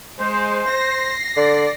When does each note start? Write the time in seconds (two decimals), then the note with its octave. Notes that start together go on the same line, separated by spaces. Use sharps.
0.19 G#3 C5
0.70 A#6 C7
1.36 D3 D5